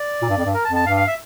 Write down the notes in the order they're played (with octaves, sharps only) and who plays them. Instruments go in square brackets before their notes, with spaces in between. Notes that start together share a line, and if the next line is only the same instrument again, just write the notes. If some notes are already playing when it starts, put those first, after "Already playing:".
Already playing: [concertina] D5
[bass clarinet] A#2
G2
F2
G2
[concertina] A#4
A5
[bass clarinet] F2
[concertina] A5
[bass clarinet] G2 [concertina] F5
[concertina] F5
E5